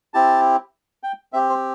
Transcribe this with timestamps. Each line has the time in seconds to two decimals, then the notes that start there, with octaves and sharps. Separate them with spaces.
0.14 C4 E4 G4 A5
1.03 G5
1.33 C4 G4 E5
1.49 C5